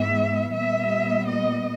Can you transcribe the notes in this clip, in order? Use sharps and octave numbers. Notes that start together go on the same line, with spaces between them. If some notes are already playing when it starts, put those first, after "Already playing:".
Already playing: G#2 E3 G#3 B3 E5
A#2 G3 B3 E5
D#5